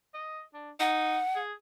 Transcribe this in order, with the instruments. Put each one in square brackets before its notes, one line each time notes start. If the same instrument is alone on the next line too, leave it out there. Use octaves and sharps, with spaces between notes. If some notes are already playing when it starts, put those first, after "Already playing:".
[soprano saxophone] D#5
D4
[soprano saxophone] D#4 [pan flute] F#5
[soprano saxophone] G#4